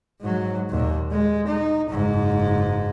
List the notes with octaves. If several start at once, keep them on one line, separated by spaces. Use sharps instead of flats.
G#2 F#3
D#2 A#2
G#3
D#4
F#1 G#2